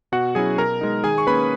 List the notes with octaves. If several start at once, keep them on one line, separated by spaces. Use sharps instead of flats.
B2 F#4 F#5
F#3 C#4 E4 G#4 G#5
B2 A#4 A#5
G#3 D#4
D#3 G#4 G#5
C#6
A#3 C#4 B4 B5